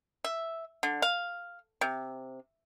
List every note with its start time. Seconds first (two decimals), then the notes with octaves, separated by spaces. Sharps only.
0.24 E5
0.83 D3
1.02 F5
1.81 C3